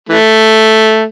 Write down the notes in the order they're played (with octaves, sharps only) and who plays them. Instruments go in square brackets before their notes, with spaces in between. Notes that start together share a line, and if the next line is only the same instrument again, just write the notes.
[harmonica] E3 A3